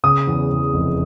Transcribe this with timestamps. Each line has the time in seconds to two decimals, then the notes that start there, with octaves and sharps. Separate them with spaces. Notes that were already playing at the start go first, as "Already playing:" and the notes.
0.04 C#3 D#6
0.27 E2
0.51 E2
0.74 F1